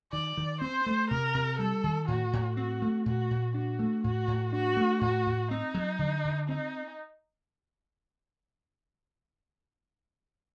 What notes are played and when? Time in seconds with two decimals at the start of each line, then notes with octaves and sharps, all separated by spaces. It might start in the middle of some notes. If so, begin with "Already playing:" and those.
0.12 D#3 D5
0.37 D#3
0.61 C4 C5
0.86 A3
1.10 C3 A#4
1.34 C3
1.59 G3 A4
1.84 D#3
2.08 A2 F#4
2.33 A2
2.56 C4 F#4
2.82 A3
3.06 A#2 F#4
3.31 A#2
3.54 D4 F#4
3.79 A3
4.04 A2 F#4
4.28 A2
4.53 D4 F#4
4.77 A3
5.01 A2 F#4
5.27 A2
5.51 C4 D#4
5.74 F#3
5.99 D3
6.25 D3
6.48 C4 D#4